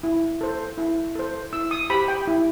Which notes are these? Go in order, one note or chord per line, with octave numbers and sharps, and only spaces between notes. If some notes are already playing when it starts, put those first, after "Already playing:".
E4
A4 C5
E4
A4 C5
E4 E6
D#6
G4 C5 B5
G5
E4